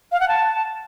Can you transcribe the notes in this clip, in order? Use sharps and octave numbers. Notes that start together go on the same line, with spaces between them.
F5
F#5
A5